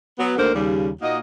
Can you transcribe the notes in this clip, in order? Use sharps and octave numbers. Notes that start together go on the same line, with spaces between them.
F#3 B3
D2 D3 D#3 A#3 A#4 C5
D#2 C#3 G3
A#2 A#3 D#4 F#4 D#5